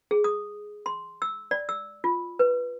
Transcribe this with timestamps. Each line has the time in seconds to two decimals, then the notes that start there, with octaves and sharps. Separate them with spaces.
0.11 G#4
0.24 D#6
0.86 C6
1.22 E6
1.51 D5
1.69 E6
2.04 F4
2.39 B4